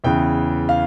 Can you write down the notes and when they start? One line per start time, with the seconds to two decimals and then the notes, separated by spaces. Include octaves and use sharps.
0.04 E2 C#3 E3 G5
0.69 F5